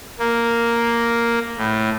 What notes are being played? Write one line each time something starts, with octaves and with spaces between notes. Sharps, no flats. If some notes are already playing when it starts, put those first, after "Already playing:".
A#3
A2